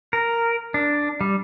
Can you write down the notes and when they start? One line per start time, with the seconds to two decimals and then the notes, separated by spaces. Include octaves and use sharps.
0.13 A#4
0.74 D4
1.21 G3